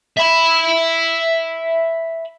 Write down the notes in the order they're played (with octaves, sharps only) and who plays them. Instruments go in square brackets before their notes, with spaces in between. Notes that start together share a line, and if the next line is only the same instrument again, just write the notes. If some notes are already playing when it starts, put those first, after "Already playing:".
[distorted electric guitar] E5 B5